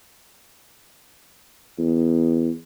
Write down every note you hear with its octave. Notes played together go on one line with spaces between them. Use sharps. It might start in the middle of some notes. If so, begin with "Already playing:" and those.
E2